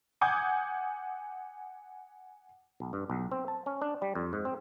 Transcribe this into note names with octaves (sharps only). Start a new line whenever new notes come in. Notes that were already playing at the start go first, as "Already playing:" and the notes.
F#5 G#5 D6 D#6 G6 G#6
B1
G2
B1
C4
A5
C#4
D4
G3
F2
G#2
C4